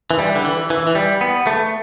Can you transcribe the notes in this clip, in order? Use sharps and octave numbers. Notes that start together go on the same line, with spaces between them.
E3
G3
D3
E3
E3
E3
G3
B3
A3